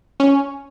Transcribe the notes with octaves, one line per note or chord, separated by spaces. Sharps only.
C#4